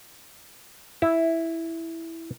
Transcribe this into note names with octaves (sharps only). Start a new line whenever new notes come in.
E4